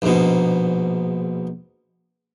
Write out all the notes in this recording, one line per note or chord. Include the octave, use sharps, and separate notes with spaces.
A#1 G#2 B2